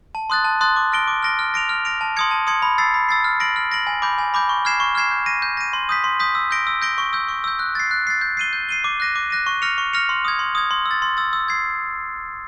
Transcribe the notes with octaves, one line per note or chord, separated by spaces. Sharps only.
A5
C6 D#6 F#6 A6
A5
C6 D#6 F#6 A6
D6
F6 A#6 D7 G7
D6
F6 A#6 D7 G7
F6
A#6 D7 F7
F6
A#6 D7 F7
A5
C6 D#6 G#6 C#7
A5
C6 D#6 G#6 C#7
B5
E6 A6 C7
B5
E6 A6 C7
F6
A#6 D7 F#7
F6
A#6 D7 F#7
G#5
B5 D6 G6
G#5
B5 D6 G6
C#6
F6 G#6 C7 E7
C#6
F6 G#6 C7 E7
G6
A#6 D#7
G6
A#6 D#7
C6
D#6 G6 B6
C6
D#6 G6 B6
E6
G6 A#6 D7 G7
E6
G6 A#6 D7 G7
C#6
E6 G6
C#6
E6 G6
F#6
A6 C7
F#6
A6 C7
G6
C7 D#7 G7
G6
C7 D#7 G7
D6
F#6 A#6 D#7
D6
F#6 A#6 D#7
C#6
F6 A#6 C#7 F7
C#6
F6 A#6 C#7 F7
C6
D#6 G#6
C6
D#6 G#6
C6
E6
A6
C6
E6 A6
E6
G#6 C7